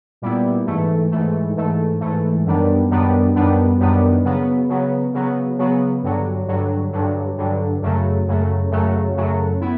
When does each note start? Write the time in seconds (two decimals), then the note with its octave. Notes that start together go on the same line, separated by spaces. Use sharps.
0.22 A#2 G3 B3 E4
0.66 G#2 E3 A3
1.11 G#2 E3 A3
1.56 G#2 E3 A3
2.01 G#2 E3 A3
2.45 F#2 D#3 G3 B3 D4
2.90 F#2 D#3 G3 B3 D4
3.35 F#2 D#3 G3 B3 D4
3.79 F#2 D#3 G3 B3 D4
4.24 C#3 F#3 B3
4.69 C#3 F#3 B3
5.14 C#3 F#3 B3
5.58 C#3 F#3 B3
6.03 G2 D3 F#3
6.48 G2 D3 F#3
6.92 G2 D3 F#3
7.37 G2 D3 F#3
7.82 F#2 C#3 F#3 A3
8.27 F#2 C#3 F#3 A3
8.71 F#2 C#3 F#3 A3
9.16 F#2 C#3 F#3 A3
9.61 B3 E4